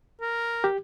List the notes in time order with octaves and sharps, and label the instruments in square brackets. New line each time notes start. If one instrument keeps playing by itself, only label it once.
[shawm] A#4
[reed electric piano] G4